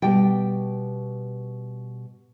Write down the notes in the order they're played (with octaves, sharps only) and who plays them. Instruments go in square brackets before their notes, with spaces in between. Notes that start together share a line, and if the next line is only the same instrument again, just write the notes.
[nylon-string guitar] B2 G3 G5